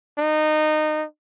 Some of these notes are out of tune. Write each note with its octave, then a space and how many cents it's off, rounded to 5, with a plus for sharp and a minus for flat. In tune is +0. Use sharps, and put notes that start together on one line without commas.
D#4 -20